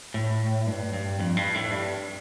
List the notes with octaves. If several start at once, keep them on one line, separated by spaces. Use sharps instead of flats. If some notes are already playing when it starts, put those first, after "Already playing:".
A2
G2
G2
F2
G2
A2
G2